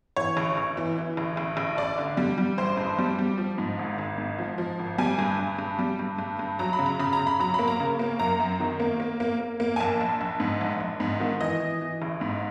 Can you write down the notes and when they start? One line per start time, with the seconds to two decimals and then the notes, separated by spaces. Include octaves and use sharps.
0.16 E3 C#5
0.37 A1
0.57 A1
0.77 E3
0.98 E3
1.17 A1
1.37 A1
1.57 A1
1.77 A1 D5
1.98 D3
2.17 G3
2.38 G3
2.58 A1 C5
2.77 G2
2.98 G3
3.18 G3
3.38 F3
3.58 G#2
3.79 G#1
3.98 G#1
4.18 G#2
4.39 F3
4.58 F3
4.79 G#1
4.98 G3 G#5
5.19 G2
5.39 G2
5.59 G2
5.79 G3
5.99 G2
6.18 G2
6.39 G2
6.59 F#3 A#5
6.73 B5
6.79 C#3
6.86 A#5
6.99 C#3 B5
7.13 A#5
7.19 C#3
7.27 B5
7.39 F#3 A#5
7.54 A#3 B5
7.68 A#5
7.80 C#3
7.99 A#3
8.19 F#2 A#5
8.40 F#2
8.60 D#3
8.80 A#3
9.00 A#3
9.20 A#3
9.40 A#3
9.60 A#3
9.76 G#5
9.80 A#1 A5
10.01 A#1
10.21 A#1
10.40 G#2
10.61 A#1
10.80 A#1
11.00 G#2
11.20 D#3
11.41 E3 D#5
11.60 E3
11.81 E3
12.02 A1
12.21 G#2